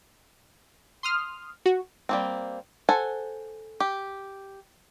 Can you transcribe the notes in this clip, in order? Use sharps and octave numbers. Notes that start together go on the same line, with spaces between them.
C6 D#6 F6
F#4
G3 A#3 C4
A4 C5 F#5 G#5
G4